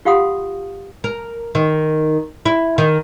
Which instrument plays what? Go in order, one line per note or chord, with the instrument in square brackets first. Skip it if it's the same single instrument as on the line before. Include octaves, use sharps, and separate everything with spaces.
[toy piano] F4 G4 F5 F#5 C6 D#6
[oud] A#4
D#3
E4
D#3